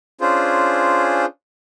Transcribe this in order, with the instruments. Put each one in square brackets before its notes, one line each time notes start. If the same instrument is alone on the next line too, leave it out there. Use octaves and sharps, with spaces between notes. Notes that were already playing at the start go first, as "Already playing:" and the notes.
[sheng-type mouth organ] C#4 D4 F4 G#4 C5